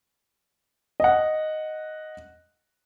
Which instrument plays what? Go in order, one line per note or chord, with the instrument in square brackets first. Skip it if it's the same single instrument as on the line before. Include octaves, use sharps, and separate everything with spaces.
[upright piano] D#5 F#5